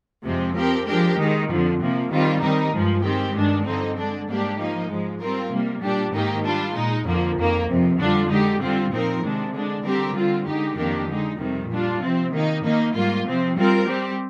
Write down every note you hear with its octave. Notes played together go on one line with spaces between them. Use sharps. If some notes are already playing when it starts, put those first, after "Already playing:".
F2 C3 F3 G#3 C4
F3 C4 G4 A#4
F3 G#3 D4 G4 A#4
D#3 G#3 D#4
F2 D3 F3
C3 F3 A#3
D#3 G3 C4 F4
D#3 G3 C4 D#4 A#4
G2 F3 G#3
D#3 G#3 C4 G4
G2 D#3 G#3 D4
G2 D3 F3 C4 D#4
D3 G#3 D4
G#2 G3 A#3 D4 G4
F3 A#3 D#4
G#2 F3 G#3
G3 C4 F4 A#4
C3 G3 A#3
A#2 G3 D4 G4
G#2 D#3 A#3 D#4 G4
G3 D4 F4
A#2 G#3 D#4
F2 D3 F3 A#3
F2 D#3 A#3
F2 C3 F3
F2 D3 G3 D4 F4
D3 G#3 D#4 G4
D3 G3 C4 F4
A#2 F3 C4 D#4 A#4
C3 D#3 G#3 D4
D3 G#3 D4
D3 G3 C4 G4 A#4
D3 G3 C4 F4
D3 G#3 D#4 G4
F2 D#3 A#3 D4 G4
D3 G#3 D#4
F2 C3 D#3 G3
A#2 G3 D4 F4
C3 F3 C4
D#3 A#3 D#4
D#3 A#3 D#4
G#2 G3 A#3 F4
C3 F3 C4
G3 C4 F4 A#4
G3 C4 G4